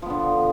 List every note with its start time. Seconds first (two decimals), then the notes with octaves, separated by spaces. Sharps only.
0.02 F3
0.06 B3
0.10 D3